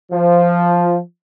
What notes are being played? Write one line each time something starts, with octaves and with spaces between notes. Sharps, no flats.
F3